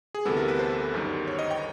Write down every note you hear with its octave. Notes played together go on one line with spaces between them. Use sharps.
G#4
D2 C3 E3 G3 B3 A4
A#4
B4
C5
G1 F#2 D#3 G3
C#5
D#5
G5